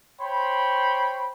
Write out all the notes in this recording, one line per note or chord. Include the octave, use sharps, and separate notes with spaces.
C5 C#5 G5 B5 C6